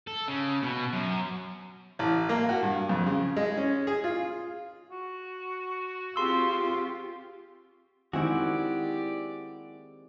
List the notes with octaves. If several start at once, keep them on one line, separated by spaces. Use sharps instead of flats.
A4
C#3
B2
F#2
A1
A#3
F#4
G2
F2
C#3
G#3
C#4
G#4
F4
F#4
C4 F4 G4 G#4 C6 E6
D#3 G#3 C4 E4 F#4 G4 D5 F#5